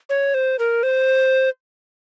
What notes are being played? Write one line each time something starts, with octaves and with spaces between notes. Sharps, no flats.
C#5
C5
A#4
C5